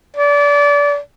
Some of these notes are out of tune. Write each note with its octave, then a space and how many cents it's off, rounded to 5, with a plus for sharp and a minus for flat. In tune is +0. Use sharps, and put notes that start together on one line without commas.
D5 -30